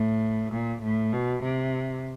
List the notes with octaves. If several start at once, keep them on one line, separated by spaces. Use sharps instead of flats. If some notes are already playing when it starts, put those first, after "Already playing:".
Already playing: A2
A#2
A2
B2
C3